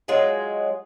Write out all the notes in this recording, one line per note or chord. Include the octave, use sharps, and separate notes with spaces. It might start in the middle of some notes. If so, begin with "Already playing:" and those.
F#3 G#3 F4 G#4